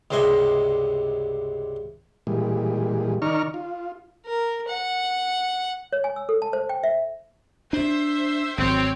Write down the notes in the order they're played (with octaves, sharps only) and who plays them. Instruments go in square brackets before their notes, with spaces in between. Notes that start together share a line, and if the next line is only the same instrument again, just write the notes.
[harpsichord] C#2 G2 C3 C5 D#5 G#5
[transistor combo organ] A#2 E3 G3 G#3
D#3 D#4 D5 A#5 C#6 F6
F4
[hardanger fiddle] A#4
F#5
[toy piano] C#5
G#5
E6
A4
A5
C5
G5
E5
[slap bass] D4 [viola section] C5 E5
[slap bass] G#1 F#3 [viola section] C4 C#5 G5